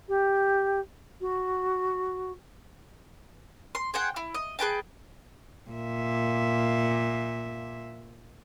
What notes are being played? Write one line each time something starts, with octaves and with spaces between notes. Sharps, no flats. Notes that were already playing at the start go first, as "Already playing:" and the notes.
G4
F#4
C6
G#4 C5 F#5 G5
E4
D#5
G#4 B4 G5 A5
A#2 E5